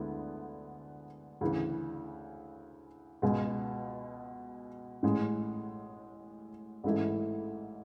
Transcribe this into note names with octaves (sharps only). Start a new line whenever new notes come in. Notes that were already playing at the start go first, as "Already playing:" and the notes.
Already playing: D2 D3 G#3 B3 E4
D2 C#3 E3
C#2 B2 G#3
A1 A2 G#3
A1 G#2 E3 A3 E4